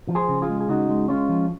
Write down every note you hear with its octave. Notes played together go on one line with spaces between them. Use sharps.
F3
G#4 C5
C#3
F4 G#4
G#3
G#4
C#3 D#4 F#4
G#3
G#3 C#4 F4
F3